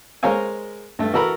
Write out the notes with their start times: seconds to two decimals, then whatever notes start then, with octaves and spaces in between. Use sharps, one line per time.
0.23 G#3 A#4 C5 C#5 F5 G#5
0.99 G2 A3
1.13 E3 F#4 A4 A#4 B5